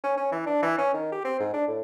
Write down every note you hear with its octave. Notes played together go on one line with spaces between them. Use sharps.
C#4
C#4
E3
D4
E3
C#4
D#3
G4
C4
G#2
D4
A2